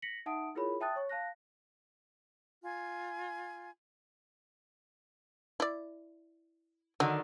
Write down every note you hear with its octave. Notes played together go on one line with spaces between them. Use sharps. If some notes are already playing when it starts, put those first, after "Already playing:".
A#6 B6 C#7 F#7
D#4 E5 F#5 A5 D#6 D7
E4 F4 G#4 A#4 C#5 B5
E5 G5 A5 D#6 F#6 A6
C#5 C#6
F5 A5 F#6 A#6
F4 G#5
E4 D5
D3 D#3 F#3